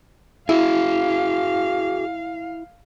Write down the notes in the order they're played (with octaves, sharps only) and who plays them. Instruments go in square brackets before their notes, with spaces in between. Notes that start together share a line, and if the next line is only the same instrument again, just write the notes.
[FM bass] E4 [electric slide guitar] F#4 G#4 [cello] F5